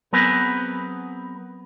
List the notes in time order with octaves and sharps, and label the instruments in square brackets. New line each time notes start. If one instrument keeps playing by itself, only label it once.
[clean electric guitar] F#3 B3 C4 G#4 A#4 B4